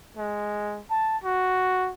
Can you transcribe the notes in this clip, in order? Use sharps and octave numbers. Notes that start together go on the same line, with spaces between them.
G#3
A5
F#4